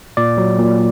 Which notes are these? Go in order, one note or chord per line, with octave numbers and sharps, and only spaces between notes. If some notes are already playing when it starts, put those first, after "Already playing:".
A#2 D5
F#3
A#2